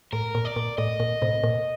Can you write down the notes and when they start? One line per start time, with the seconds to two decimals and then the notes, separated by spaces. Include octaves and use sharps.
0.13 A2 A#4
0.35 A#2
0.45 D5
0.56 A#2
0.78 A2 D#5
1.00 A#2
1.22 A2 C3
1.43 A#2